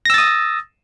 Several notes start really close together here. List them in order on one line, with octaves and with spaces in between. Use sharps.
A#6 E6 A6 D#6